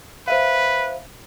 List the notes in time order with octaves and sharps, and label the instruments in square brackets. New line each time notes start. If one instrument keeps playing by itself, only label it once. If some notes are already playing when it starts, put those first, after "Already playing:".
[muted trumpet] B4 [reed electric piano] C5 E5 F5